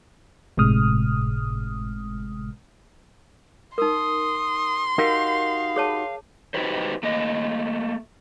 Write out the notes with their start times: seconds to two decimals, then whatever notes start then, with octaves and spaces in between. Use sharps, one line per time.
0.57 G1 A2 C3 G#3 D#6 F6
3.78 D#4 A#4 C6 D#6
4.98 D#4 F#4 G4 A#4 F5
5.76 G#4 C#5 A5
6.54 D#4 F#4 G4 B4 C5
7.03 A3 A#3 D#5